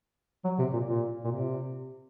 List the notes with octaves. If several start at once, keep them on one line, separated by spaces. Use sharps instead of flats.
F#3
C3
A#2
A#2
A#2
C3